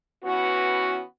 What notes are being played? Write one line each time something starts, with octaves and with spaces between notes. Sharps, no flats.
E3 B3 C#4 F#4